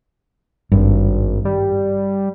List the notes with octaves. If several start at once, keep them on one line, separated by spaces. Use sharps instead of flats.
G#1 G2
G3